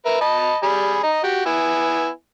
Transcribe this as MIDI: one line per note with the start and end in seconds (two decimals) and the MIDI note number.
0.06 0.20 70
0.06 0.20 71
0.06 0.20 76
0.21 0.57 75
0.21 0.57 81
0.21 0.57 83
0.63 1.01 55
0.63 1.01 68
0.63 1.01 83
1.03 1.20 75
1.03 1.20 82
1.24 1.45 66
1.24 1.45 67
1.46 2.09 59
1.46 2.09 64
1.46 2.09 80